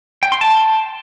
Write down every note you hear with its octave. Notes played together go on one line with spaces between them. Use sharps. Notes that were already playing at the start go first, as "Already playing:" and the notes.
G5
C6
A5